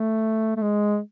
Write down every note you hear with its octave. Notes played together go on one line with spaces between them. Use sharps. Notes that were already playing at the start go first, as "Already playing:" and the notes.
Already playing: A3
A3
G#3